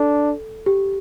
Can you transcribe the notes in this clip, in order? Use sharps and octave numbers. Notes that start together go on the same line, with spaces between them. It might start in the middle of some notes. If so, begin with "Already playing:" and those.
Already playing: D4 A4
G4